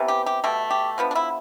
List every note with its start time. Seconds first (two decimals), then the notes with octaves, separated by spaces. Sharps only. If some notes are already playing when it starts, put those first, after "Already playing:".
Already playing: C3 E3 G3 B3
0.08 G4
0.26 G4
0.44 B2 A3 G4
0.70 G4
0.98 D3 F3 B3
1.11 D4
1.15 E4